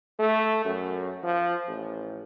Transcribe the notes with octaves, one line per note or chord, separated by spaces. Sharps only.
A3
F#2
F3
A1